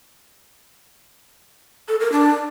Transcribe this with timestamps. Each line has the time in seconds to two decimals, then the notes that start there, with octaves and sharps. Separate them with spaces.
1.88 A4
2.00 A#4
2.12 D4